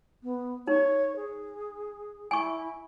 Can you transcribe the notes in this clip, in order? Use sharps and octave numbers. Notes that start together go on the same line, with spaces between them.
B3
D#4 C#5
G#4
E4 G#5 C#6